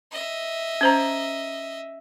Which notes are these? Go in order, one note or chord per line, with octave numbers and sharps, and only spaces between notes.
D#5 E5
C#4 C5 A#5